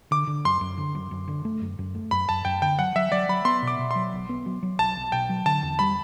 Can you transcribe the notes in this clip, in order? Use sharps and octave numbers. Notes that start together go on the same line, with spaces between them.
D3 D6
D3
F#2 C6
F#2
D3
F#2
F#2
D3
A3
F#2
F#2
A3
F#2 B5
F#2 A5
F#2 G5
D3 G5
F#3 F#5
F#3 E5
F#3 D5
F#3 B5
B3 C6
B2 D6
B2
F#3 C6
B1
B3
F#3
F#3
B1 A5
B1
B2 G5
F#3
D3 A5
E2
G3 B5